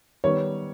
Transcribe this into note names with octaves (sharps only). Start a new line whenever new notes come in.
D#3 G3 B3 C#5